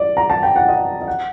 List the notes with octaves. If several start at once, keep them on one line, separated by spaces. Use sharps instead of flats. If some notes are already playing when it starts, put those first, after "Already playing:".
Already playing: D5
A#5
A5
G5
F#5
D#5
D#5
F#5